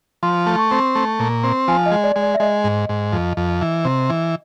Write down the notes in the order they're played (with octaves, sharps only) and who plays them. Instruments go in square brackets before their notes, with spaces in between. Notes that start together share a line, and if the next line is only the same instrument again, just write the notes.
[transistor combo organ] F3 [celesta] C6
[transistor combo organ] A3
[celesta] C#6
[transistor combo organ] C4
A3
A#2
C4
[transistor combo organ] F3 [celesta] G#5
[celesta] D#5
[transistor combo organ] G#3
[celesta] D5
[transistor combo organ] G#3
[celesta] D5
E5
[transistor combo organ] G#3 [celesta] D#5
[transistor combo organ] G#2
G#2
F2
F2
E3
C3
E3